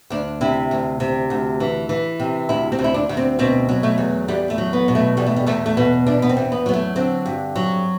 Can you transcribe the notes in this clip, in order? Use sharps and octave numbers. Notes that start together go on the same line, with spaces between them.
D2 D4
C3 E4
D2
C3
D2
E3
E3
C3
D2 E4
C4
D2
E4
D4
D2
C4
B2 C4
F#3
A3
E2
E2 G3
A3
F#3
B3
B2
A3
E2 G3
A3
G3
E2 A3
A3
B2 B3
E2 D4
B3
C4
E2
B3
F#3 B3
A3
D3 C4
G2
F#3